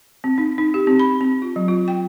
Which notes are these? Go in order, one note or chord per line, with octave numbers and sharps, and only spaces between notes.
C4
D#4
D#4
G4
C4
B5
C4
F4
F#3
F4
G5